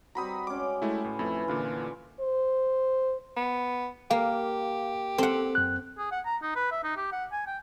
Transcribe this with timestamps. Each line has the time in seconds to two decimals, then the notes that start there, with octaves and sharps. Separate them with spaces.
0.15 G3 C4 F#4 A#5 B5 D#6
0.47 G#3 C#4 D6
0.82 G#3 A3 E4 G4
1.04 A2 B4
1.19 F2 E3 A3 E4
1.48 A#2 D3 E3 F4
2.20 C5
3.37 B3
4.11 A#3 G4 F5
5.18 C4 A4 F#5
5.55 F#2 F#6
5.98 G#4
6.11 F#5
6.25 A#5
6.42 D#4
6.56 B4
6.71 E5
6.84 D#4
6.97 G4
7.12 F#5
7.32 G#5
7.47 G5